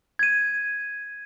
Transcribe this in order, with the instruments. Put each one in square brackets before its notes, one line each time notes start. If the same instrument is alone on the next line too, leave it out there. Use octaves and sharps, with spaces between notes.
[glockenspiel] G#6 D#7